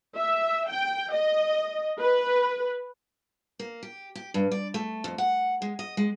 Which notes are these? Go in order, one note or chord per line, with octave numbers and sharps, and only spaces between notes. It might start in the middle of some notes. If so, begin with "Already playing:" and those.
E5
G5
D#5
B4
A#3
G4
G4
G2
D5
A3
F2
F#5
G#3
D#5
G#3